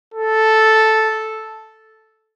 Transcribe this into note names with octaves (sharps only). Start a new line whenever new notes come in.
A4